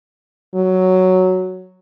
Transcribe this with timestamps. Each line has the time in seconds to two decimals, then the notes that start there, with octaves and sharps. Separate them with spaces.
0.55 F#3